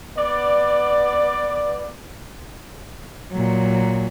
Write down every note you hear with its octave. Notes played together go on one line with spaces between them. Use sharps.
B3 D5
A#2 F#3